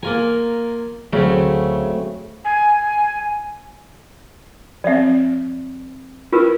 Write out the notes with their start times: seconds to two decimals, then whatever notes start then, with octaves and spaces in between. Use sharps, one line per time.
0.03 A#3 F4 A#4 G#5
1.13 D2 C#3 F#3 A3 C4
2.45 G#5
4.84 F3 C4 D5 E5
6.32 E4 F4 A#4 B4